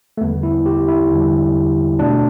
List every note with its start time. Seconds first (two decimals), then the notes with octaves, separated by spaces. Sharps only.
0.18 A3
0.21 E2 D3 G3 B3
0.43 E4
0.66 G4
0.88 E4
1.10 E2 D3 G3
1.99 B2 A3 D4